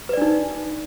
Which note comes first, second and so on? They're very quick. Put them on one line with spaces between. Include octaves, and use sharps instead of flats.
B4 D5 D4 D#4